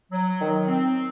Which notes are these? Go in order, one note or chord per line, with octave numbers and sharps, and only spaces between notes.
F#3
D#3
C4